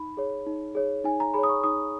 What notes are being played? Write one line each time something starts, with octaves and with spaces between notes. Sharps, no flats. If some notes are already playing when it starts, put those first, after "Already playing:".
Already playing: D#4 B5
G#4 C#5
D#4
G#4 C#5
D#4 G#5
A#5
G#4 C#5 B5
D#6
C#6
D#4 D#6